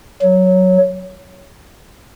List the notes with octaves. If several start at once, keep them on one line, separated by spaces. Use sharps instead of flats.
F#3